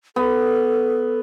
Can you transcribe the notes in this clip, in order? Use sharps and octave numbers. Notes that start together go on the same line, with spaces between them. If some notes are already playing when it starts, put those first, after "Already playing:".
B3 A4